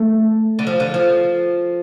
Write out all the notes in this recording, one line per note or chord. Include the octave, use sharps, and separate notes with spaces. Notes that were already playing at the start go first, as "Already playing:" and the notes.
Already playing: A3
D3
F3
D3
F3